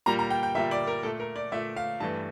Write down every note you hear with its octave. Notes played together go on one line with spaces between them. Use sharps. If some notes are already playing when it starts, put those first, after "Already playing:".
A#2 G3 A#3 A#5
A#5
G5
G5
A#2 G3 A#3 E5
D5
A#4
A#2 A3 A4
A#4
D5
A#2 A3 E5
F5
G2 E3 A3 A5